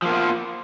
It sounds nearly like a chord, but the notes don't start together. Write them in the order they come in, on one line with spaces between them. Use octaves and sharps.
F3 A#3 B3 F4